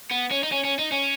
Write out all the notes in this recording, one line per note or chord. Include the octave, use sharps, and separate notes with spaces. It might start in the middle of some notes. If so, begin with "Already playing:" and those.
B3
C#4
D#4
C#4
C#4
D#4
C#4